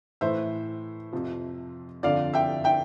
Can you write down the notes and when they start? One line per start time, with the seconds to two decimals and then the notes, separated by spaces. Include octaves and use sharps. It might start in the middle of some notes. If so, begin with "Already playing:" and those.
0.21 A2 E3 C5 E5
1.13 F2 C3 F3
2.03 F2 D3 F3 D5 F5
2.34 E5 G5
2.64 E5 G5